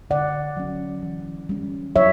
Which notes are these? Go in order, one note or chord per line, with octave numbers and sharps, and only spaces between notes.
D3 D5 F#5
F#3 C#4
E3
G3 C#4
F#3 C#5 E5